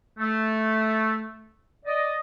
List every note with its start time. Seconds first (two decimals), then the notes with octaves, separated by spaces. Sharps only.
0.18 A3
1.85 D5 D#5